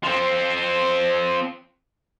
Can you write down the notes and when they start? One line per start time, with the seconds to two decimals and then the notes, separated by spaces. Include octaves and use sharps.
0.03 F3 C4